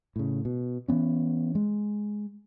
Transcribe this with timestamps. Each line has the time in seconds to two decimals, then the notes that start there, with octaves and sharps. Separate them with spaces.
0.16 A2 C#3
0.45 B2
0.88 E3 F3 B3 C#4
1.55 G#3